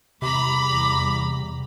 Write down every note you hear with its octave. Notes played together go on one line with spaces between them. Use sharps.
E2 C3 G3 A#5 B5 D6